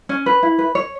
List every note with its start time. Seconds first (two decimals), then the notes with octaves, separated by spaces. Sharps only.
0.09 C#4
0.26 B4
0.43 E4
0.59 B4
0.75 C#5